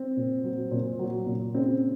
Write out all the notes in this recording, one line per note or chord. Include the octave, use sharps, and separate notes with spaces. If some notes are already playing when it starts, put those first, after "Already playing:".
Already playing: C4
A#2
F#3
A#2
F#3
A#2
C#3 C4